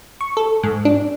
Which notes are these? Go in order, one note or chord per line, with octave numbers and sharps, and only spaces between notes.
C#6
A4
G#2
D4